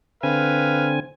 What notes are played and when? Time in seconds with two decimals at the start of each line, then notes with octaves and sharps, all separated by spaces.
0.23 D3 C4 B4 F5 G#5